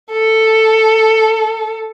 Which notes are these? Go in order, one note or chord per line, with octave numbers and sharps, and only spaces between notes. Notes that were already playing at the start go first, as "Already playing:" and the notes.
A4